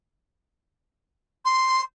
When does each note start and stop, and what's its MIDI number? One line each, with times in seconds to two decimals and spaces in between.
1.45 1.81 84